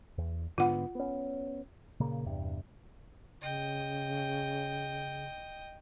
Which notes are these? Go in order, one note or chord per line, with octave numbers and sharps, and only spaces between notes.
E2
G#2 D3 B3 F4 F#5
B3 C#4
A#2 C#3 A#3
E2 G2 C3
C#3 D#5 G5